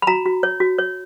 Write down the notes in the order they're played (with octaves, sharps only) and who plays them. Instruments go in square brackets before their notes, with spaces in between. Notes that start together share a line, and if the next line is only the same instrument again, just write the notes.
[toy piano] B5
F#4 A#5
F#4
C#5
F#4
C#5